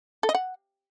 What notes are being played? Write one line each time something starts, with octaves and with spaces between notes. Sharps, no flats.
A4
D#5
F#5